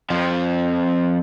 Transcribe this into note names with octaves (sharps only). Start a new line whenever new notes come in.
F2 F3